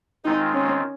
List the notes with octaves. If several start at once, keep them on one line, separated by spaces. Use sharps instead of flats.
D#3 G#3 C4 D#4 F4
C#4